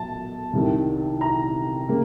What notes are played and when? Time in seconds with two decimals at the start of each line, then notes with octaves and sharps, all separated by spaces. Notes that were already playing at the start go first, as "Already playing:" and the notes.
Already playing: B1 B2 A5
0.53 C2 C3 D#3
1.21 A#5
1.89 C#3 A#3